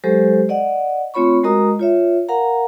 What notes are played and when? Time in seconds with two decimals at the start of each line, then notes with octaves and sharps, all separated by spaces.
0.04 F#3 G#3 G4 A4 C5
0.49 D5 D#5 F#5
1.14 A3 C4 F4 C#5 B5 C#6
1.44 G#3 F#4 A#4 D#5 A#5 D#6
1.79 F4 C#5 E5
2.29 A#4 F5 F#5 A#5